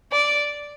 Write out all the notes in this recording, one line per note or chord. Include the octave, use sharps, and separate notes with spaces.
D5